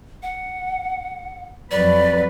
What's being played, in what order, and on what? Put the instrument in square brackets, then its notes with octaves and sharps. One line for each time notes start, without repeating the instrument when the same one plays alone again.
[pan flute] F#5
[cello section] F2 F#3 B4 [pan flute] D5